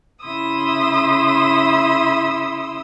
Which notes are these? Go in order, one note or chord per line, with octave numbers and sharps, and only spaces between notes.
C#3 E4 C6 D#6 E6